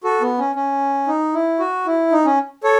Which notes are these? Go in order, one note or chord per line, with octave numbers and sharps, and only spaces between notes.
F#4 A4
B3
C#4
C#4
D#4
E4
F#4
E4
D#4
C#4
A4 C#5